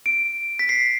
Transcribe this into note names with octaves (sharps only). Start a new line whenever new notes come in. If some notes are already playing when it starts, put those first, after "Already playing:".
D7
B6
C7